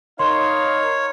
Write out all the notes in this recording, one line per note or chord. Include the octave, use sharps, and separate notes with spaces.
D#4 A#4 C#5 F5 C6